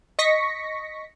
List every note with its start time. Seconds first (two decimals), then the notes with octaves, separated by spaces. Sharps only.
0.19 D#5 C#6 A#6 B6 C#7